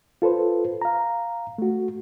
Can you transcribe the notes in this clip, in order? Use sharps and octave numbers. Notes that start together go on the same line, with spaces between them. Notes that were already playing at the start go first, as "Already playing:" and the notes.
F4 A4 B4 C5
F5 A#5
A3 F#4